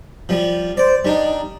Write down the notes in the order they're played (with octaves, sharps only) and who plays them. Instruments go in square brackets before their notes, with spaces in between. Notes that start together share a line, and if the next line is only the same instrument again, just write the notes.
[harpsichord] F3 G3
[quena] C5 [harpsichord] D5
[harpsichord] G3 D4 [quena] D#4